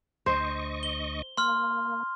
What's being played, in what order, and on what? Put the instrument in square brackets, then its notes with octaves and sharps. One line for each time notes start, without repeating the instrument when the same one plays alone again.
[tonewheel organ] D2 D#5 C#6 [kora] C5
[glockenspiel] G7
[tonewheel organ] A#3 [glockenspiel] C6 F6